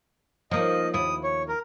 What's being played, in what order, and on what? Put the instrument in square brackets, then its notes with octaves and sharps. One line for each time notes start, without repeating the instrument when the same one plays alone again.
[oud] F3 A#3 D#4 [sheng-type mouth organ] D#5
[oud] D#2 E4 [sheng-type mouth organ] D#6
[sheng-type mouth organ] C#5
A#4